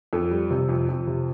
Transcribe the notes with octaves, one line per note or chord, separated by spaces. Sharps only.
F2 A4
G3
C3
F2
F2
C3